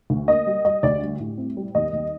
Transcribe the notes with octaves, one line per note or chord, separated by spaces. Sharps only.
D2
A#3 D#5
G3
G3 D#5
D2 D5
G3
A2
C4
G3
D#2 D#5
D#2